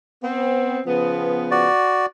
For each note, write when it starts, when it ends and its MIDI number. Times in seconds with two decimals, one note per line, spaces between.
0.24 0.80 59
0.24 0.80 60
0.87 1.68 49
0.87 1.68 53
0.87 1.68 59
1.51 2.06 66
1.51 2.06 74